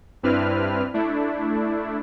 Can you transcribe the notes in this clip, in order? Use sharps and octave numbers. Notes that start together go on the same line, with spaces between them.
G2 C4 D4 E4 B4 F6
A3 D4 E4